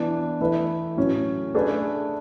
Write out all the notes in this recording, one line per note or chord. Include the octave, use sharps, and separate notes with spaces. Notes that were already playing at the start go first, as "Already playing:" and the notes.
Already playing: E3 B3 D4
E3 A3 E4 B4
A2 F#3 C#4
A3 D4 G#4 B4